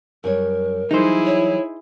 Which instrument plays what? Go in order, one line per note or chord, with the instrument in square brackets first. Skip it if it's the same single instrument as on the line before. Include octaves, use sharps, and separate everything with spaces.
[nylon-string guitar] F#2 G3 C#5 [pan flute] A#4
[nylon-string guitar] E3 F#3 G3 [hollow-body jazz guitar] D#4 C5 [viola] E4 G#4
[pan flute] C#5